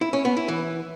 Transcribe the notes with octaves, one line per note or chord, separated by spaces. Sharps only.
E4
C#4
B3
E4
E3